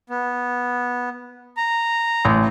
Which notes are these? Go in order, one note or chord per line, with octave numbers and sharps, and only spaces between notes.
B3
A#5
A1